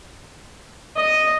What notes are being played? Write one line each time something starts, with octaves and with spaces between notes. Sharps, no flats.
D#5